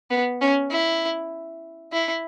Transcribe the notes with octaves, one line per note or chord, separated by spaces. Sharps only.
B3
C#4
E4
E4